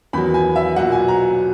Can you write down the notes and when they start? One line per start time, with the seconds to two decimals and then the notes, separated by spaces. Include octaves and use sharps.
0.13 E2 D#3 F#3 B5
0.34 G#5
0.56 E5
0.76 B1 A#2 F#3 F#5
0.92 G#5
1.08 A#5